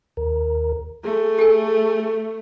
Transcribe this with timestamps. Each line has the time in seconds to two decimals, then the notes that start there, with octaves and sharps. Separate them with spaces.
0.17 D#2 A#4
1.05 A3 G#4
1.39 G4 A4 G#5